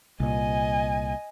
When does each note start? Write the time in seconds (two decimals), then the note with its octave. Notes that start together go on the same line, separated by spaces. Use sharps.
0.20 C2 A#2 D#5 G#5